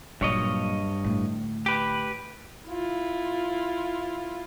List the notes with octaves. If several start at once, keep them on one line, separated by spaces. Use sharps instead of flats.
G2 A#2 F#3 C#5 D#5
A2 D3
G4 B4
E4 F4